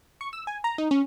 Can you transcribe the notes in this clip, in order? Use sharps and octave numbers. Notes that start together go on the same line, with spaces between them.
C#6
E6
G#5
A#5
D#4
C#4